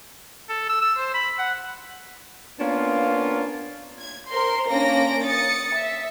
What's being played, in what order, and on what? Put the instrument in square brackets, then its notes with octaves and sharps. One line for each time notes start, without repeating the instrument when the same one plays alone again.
[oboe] A4
E6
E6
C5
B5
F#5
[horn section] A#3 B3 C#4 D4 F4
[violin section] G#6
A#4 C5 C6
A#3 C#4 D4 A#6 D7
D#6 A6 C#7
E5